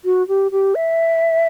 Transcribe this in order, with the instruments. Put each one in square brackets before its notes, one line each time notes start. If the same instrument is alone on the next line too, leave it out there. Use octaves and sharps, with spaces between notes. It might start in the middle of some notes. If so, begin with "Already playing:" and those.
[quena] F#4
G4
G4
E5